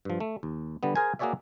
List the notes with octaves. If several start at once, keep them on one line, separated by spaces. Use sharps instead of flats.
G2 F3
A3
D#2
D3 G3 B3
G#4 A#4 C5 G#5
A#3 F#4 G#4 C#5 D5 E5